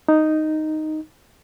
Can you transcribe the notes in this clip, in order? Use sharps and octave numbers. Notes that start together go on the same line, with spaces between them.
D#4